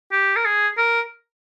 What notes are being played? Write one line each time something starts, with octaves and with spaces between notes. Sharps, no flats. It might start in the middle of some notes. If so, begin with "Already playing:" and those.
G4
A#4
G#4
A#4